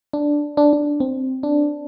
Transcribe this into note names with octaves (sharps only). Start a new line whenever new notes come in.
D4
D4
D4
C4
D4